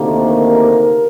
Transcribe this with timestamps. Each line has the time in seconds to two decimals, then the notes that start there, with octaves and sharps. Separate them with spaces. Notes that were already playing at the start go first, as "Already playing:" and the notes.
Already playing: D2 C3 D#3 A#3
0.27 A#4